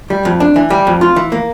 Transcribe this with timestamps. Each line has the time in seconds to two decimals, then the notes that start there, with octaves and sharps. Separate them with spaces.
0.10 G3
0.25 F2
0.40 D4
0.56 E3
0.70 G3
0.87 F2
1.01 F4
1.16 E3
1.32 A#3